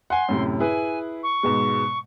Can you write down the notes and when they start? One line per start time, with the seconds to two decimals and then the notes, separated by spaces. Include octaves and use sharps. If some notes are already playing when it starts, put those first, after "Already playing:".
0.10 F#5 G#5 C6
0.28 F#2 A2 C3
0.60 E4 G#4 B4 G#5
1.23 C#6
1.43 G#2 B2 G#3